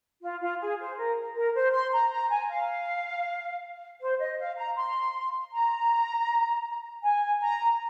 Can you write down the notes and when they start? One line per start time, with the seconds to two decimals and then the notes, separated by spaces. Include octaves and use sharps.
0.23 F4
0.41 F4
0.60 G#4
0.80 C5
0.98 A#4
1.36 A#4
1.55 C5
1.73 C6
1.93 A#5
2.12 A#5
2.31 G#5
2.49 F5
4.01 C5
4.20 D#5
4.39 F5
4.58 A#5
4.76 C6
5.52 A#5
7.04 G#5
7.42 A#5